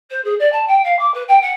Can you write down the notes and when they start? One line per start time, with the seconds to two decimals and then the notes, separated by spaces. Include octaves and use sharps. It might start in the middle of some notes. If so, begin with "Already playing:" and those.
0.10 C5
0.24 G#4
0.39 D5
0.52 A5
0.67 G5
0.84 F5
0.99 D6
1.14 B4
1.28 G5
1.41 F#5